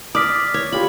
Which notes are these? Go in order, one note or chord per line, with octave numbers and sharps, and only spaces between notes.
D5 D6 D#6 F6 B6
C#5
F4 G4 B5